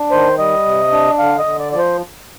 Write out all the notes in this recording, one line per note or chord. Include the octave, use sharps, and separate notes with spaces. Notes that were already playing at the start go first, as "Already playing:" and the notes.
Already playing: D4
D#3 C5
G3 D#5
C3
D4
D3 F5
D#5
D3
D5
F3 D5
C5